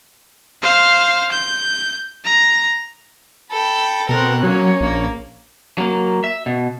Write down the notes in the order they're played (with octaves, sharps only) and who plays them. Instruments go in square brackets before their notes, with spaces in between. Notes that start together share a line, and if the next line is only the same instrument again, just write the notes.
[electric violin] C5 F5
G6
A#5
[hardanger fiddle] A4 G5 [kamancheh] B5
[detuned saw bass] B2 [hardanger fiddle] C4 A#4 [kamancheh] A4 F#6
[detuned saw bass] F#3 [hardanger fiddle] A#3 C#4 [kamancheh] C#5
[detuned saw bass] A#1 [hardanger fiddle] A#3
[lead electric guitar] F#3 A#3
E5
B2